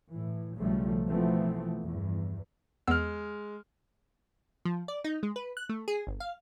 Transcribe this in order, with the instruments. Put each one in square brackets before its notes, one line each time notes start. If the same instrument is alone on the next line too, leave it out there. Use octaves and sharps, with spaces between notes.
[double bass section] A2 E3
B1 C#3 F3 G3 A3
B2 E3 F3 A3 B3 C4
E2 G2
[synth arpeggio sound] E2 B3 E6 [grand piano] G#3 F6
[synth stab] F3
D5
D#4
G#3
B4
F#6
A3
G#4
G1
F5